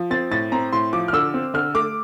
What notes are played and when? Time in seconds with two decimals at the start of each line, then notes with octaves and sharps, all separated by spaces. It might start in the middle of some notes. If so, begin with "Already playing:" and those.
Already playing: F3
0.11 C4 A6
0.31 A2 A6
0.52 C4 A#5
0.73 A2 C6
0.93 F3 D6
1.08 F6
1.13 D3 E6
1.34 C4
1.54 D3 F6
1.74 A3 D6